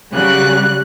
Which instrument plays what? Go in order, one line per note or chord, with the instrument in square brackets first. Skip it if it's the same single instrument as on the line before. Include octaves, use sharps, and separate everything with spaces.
[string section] C#3 F#3 G3 F#6